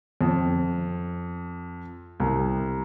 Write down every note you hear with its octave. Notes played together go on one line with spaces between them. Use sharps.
F2
C2